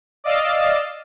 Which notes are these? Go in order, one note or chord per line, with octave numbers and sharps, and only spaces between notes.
D5 D#5 F5 E6 A6